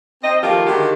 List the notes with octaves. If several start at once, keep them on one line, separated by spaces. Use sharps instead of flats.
C4 D#5
D#3 F3 A3 A#3 F4 G4
D3 D#3 G#3 A#3 F#4 G4